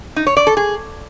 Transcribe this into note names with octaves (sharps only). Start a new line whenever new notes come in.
D#4
C#5
D5
A4
G#4